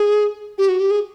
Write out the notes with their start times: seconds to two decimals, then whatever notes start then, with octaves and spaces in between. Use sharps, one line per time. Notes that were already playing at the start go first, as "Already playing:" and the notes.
Already playing: G#4
0.58 G4
0.69 F#4
0.80 G4
0.91 G#4